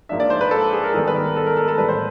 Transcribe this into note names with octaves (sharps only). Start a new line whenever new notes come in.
G#2 F3 A#3 D4 E5
D5
C5
B4
A4
G#4
A#4
G#2 D#3 G3 B3 A4
B4
A#4
A4
A#4
A4
A4
A2 E3 G3 B4
C5